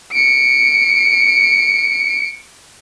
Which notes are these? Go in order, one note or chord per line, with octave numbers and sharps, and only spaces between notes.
C#7 D7